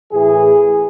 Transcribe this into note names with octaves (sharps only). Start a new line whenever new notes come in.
A2 E3 G#4